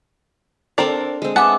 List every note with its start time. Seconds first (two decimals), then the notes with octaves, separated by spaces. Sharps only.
0.78 C4 D4 A4 A#4 D5
1.22 G#3 C4
1.36 B3 E5 F#5 G#5 A5 D6